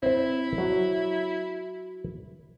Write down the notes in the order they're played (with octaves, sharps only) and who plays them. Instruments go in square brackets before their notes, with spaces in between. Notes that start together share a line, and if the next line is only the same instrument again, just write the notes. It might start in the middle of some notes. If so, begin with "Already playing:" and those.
[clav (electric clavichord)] C4 C5 [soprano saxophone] E4
[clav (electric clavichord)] F#3